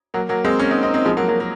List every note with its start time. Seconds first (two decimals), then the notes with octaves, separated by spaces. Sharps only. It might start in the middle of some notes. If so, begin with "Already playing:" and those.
0.14 F#3 A#3
0.29 F#3 A#3
0.44 G#3 C4
0.59 A#3 C#4
0.71 C4 D#4
0.83 C4 D#4
0.94 C4 D#4
1.05 F3 G#3
1.17 F#3 A#3
1.28 F#3 A#3
1.40 A#3